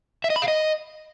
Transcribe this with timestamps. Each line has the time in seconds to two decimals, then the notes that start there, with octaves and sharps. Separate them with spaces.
0.24 E5
0.30 D#5
0.36 B5
0.42 F5
0.48 D#5